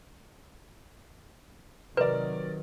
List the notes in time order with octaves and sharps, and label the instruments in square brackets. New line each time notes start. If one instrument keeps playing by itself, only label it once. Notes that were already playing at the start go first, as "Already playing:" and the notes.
[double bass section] C3 D#3 F#3 [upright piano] A#4 D5 [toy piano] B4